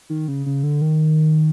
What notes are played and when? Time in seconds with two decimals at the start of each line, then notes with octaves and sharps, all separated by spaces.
0.10 D#3
0.28 C#3
0.46 C#3
0.63 D3
0.82 D#3